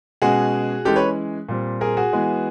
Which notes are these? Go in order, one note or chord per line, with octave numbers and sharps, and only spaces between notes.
B2 G#3 C#4 F#4 G#4
E3 G#3 C#4 G4 A4
B4 C#5
A#2 G3 C4
G#4 A#4
F#4 G#4
E3 G#3 B3